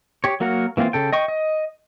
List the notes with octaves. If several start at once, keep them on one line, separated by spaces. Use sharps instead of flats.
G4 C#5
F#3 A#3 F#4 A#4 F#5
E3 A#3 C4 E4 F4
C#3 A4 G5
D#5 G5 C#6
D#5